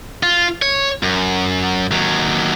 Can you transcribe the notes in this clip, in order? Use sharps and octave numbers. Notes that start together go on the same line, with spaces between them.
F4
C#5
F#2
D#2 F#3